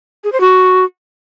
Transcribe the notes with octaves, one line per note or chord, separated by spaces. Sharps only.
G#4
C5
F#4